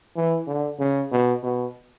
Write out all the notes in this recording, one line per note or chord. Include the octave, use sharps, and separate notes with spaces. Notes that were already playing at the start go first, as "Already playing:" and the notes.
E3
D3
C#3
B2
B2